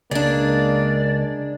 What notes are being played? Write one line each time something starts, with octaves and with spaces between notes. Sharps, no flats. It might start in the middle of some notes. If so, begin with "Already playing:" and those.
C#2 G#3 A#3 D4 D5